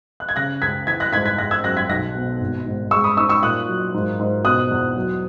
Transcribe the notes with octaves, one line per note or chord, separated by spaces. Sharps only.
F#6
G#6
C#3 F#6 A#6
C#2 G#6 B6
E3 G#6 B6
F#6 A#6
G#2 G#6 B6
G#6 B6
G#3 F#6 A#6
E6 G#6
F#2 F#6 A#6
G#6 B6
B1 F#6 A#6
B2
G#1
G#2
G#3 C#6 E6
B5 D#6
D#4 C#6 E6
C#6 E6
A#2 D#6 F#6
F#3
G#2
G#2
B2 D#6 F#6
E2
F#3